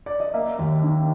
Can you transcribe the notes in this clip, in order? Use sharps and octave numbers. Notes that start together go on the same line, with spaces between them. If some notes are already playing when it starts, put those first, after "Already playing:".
D5
D#5
A#3 E5
D#2
D#3